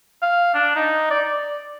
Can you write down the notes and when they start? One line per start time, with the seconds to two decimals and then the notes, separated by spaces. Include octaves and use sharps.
0.22 F5
0.54 D4
0.76 D#4
1.10 D5
1.24 D5